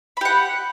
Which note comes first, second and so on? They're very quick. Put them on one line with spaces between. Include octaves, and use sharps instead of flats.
B5 G4 F#5